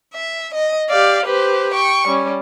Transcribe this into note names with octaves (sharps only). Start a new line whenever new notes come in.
E5
D#5
G4 D5 F5
G4 B4 C5
G5 C#6
G3 C#4